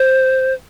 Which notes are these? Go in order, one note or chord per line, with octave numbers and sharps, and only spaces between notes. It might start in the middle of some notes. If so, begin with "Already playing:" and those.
Already playing: C5